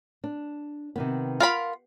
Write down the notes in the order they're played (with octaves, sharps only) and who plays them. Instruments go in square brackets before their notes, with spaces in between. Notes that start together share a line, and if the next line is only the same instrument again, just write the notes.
[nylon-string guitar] D4
C3 D#3 B3
[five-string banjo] F4 A#4 B5 [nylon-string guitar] F#5